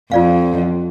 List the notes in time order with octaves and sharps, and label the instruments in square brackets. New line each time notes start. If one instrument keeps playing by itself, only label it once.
[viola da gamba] F2 [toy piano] F4 D5 F5